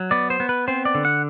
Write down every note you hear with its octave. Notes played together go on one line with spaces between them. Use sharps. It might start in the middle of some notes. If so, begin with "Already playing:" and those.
Already playing: F#3
B3 D5
C5
B3
B4
C4 C5
D5
D3
F#5